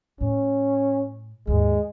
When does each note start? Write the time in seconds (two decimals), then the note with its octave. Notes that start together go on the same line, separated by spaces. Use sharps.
0.21 A2 C#4
1.47 D#2 G#2 G#3